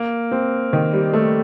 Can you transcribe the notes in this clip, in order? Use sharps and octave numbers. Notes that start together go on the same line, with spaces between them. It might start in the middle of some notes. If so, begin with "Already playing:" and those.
Already playing: A#3
C4
D#3
G3
A3